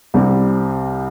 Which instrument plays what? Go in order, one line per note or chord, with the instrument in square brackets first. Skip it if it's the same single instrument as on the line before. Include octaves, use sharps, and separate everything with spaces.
[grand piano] C2 C3 G3 C4 G4